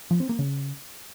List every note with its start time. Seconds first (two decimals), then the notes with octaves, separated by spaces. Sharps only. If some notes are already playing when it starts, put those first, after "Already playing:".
0.11 F3
0.20 C4
0.29 A#3
0.39 C#3